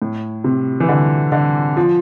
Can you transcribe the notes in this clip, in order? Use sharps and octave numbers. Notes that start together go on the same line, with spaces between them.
A2
C3
E3
D3
D3
F3